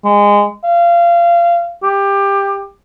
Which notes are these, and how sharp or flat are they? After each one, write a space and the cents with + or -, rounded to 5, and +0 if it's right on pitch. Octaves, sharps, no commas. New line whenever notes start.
G#3 -20
F5 -25
G4 +20